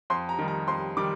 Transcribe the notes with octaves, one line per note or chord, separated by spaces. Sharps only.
F2 C6
A#5
D#3 G3
A#5
F2 C6
D#3 G3 D6